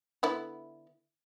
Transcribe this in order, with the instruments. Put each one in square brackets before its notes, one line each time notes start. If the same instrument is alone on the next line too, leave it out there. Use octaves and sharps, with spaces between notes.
[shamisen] D3 B3 E4